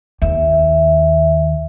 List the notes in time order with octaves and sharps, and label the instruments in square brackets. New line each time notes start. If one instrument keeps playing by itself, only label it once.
[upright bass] D#2 [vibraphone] E5